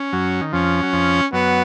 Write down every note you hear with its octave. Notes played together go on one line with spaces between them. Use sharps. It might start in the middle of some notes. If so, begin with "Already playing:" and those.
Already playing: C#4
F#2 F#3
D#3
F2 F3 C#4
F#3
F2 F3
F#2 F#3 B3